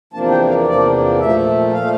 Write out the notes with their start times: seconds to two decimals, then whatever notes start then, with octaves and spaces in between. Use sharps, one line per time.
0.13 E2 C3 F3 A#3 D4 A5
0.31 G5
0.49 F5
0.67 E2 C3 F3 A#3 D4 D5
1.20 A#2 F3 A3 E5
1.73 A#2 F3 A3 F5